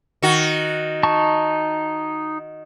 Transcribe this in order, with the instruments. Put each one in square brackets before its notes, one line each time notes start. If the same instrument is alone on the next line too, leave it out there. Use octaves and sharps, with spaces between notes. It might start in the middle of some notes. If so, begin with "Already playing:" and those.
[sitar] D#3 F#4
[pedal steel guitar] D#4 A5 C#6